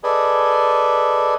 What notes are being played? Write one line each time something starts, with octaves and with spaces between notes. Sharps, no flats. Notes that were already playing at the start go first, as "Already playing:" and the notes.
G#4 A4 B4 D5 D#5 G#5